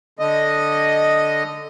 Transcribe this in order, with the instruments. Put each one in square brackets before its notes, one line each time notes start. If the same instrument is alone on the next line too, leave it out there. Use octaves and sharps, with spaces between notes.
[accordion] D3 D#5